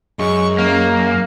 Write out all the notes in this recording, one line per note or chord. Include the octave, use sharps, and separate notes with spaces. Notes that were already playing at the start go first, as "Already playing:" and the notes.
F#2 G#3 C#6
A#3 C#4